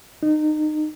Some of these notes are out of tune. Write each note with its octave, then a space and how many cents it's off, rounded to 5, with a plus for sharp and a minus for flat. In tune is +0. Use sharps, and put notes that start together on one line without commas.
D#4 -25